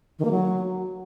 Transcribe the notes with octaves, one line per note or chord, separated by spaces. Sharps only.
D#3
A#3
F#3